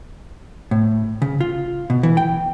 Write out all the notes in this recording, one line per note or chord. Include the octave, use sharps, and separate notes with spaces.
A2
C#3
F4
B2
E3
G5